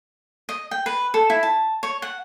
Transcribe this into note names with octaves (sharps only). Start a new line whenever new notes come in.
D#5
G5
B4
A4
E4
A5
C#5
F#5